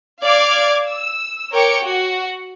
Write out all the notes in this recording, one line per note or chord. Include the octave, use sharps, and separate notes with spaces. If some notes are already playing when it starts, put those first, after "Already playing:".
D5 F5 D6 G#6
E6
A#4 C#5 G5 D6 C#7
F#4